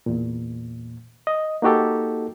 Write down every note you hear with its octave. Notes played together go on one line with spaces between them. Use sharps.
E2 A#2
D#5
A#3 D#4 F#4 G4 A4